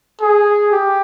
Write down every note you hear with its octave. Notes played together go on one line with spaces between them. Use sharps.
G#4
G4